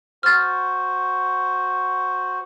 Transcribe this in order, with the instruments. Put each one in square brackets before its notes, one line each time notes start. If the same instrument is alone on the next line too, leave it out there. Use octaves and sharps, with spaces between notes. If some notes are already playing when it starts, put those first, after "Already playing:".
[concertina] F#4 C5 [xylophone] F6 A6